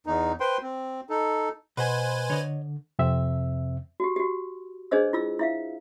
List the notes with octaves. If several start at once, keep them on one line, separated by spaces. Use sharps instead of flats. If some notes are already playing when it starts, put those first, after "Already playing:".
E2 D#4
B4 C5 G5 C6
C4
D#4 A4
B2 B4 C5 G#5
D3 C#5 D#5
F2 C3 C4 E5
F#4 G4
F#4 G4
D4 G#4 B4 C5 D#5 E6
E4 F4 E6
E4 E5 F5